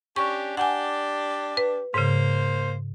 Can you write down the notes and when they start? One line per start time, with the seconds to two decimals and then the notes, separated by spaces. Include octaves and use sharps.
0.16 C#4 D4 G4 C#6
0.57 D4 G4 D5 F#5 G#5
1.57 B4
1.94 G#2 C#3 A#3 C5